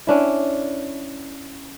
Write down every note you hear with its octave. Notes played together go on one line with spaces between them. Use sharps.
C#4 D4 E4